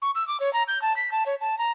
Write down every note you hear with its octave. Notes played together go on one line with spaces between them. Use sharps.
C#6
E6
D6
C#5
A#5
G6
A5
B6
A5
C#5
A5
A#5